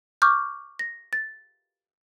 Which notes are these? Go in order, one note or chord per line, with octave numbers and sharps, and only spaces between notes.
C#6 D6 F6 G6
A#6
A6